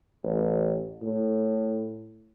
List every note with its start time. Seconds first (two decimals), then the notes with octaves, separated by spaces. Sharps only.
0.23 A1
1.02 A2